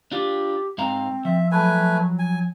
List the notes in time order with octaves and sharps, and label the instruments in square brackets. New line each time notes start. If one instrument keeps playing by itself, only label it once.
[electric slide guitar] D4 F4 [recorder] G4
[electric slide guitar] G#2 F5 A#5 [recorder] C4
[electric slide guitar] F3 [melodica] E5
[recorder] F#3 [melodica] A3 B4 G#5
[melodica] G#5